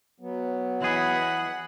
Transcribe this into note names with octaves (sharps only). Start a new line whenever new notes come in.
F#3 B3
E3 G#4 D#5 F#5 G#5 B5